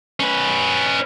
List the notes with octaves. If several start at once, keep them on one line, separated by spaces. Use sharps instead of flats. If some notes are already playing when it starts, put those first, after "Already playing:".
C#4 B4